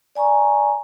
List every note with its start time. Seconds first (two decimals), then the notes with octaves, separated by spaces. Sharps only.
0.15 D5 G#5 A#5 C#6